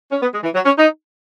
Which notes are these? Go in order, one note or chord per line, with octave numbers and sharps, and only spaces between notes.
C#4
B3
G#3
E3
F#3
C#4
D#4